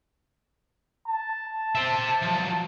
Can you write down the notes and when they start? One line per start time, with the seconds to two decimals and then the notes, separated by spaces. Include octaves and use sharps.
1.07 A5
1.75 C5 E5
2.22 F3 F#3